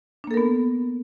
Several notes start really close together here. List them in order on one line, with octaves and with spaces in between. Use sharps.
D4 A#3 A4 A#4 B3